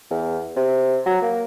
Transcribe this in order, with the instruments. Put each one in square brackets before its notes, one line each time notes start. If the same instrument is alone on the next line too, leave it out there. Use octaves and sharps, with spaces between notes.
[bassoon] E2
C3
F#3
A#3